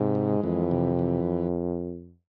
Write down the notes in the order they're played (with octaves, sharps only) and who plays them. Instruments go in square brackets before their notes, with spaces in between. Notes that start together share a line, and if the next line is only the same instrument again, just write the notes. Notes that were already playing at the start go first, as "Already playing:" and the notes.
Already playing: [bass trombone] G#2 [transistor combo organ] C3
[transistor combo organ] G#3
[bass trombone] F2 [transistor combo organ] E3
[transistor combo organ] C3
E3